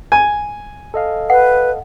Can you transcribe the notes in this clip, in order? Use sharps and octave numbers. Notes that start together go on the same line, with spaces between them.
G#5
A4 D#5 F5
B4 F#5